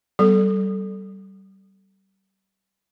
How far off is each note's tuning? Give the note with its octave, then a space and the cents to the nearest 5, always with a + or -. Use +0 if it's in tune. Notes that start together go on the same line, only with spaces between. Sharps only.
G3 -25 B3 +0 A4 +0